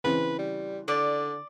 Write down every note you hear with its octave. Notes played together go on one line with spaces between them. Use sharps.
C#3 E3 C4 B4
G3
D3 D5